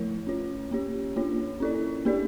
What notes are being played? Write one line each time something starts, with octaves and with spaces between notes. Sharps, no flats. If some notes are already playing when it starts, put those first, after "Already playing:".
Already playing: F3 A3 E4 A#4 C#5
C#4 F4 C#5
A#3 C#4 G4 C#5
A#3 D4 F4 C#5
C#4 E4 A4 D5
A#3 D4 G4 A#4 D5